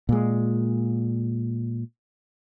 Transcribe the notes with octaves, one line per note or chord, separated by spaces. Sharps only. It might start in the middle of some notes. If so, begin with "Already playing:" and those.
A#2 G#3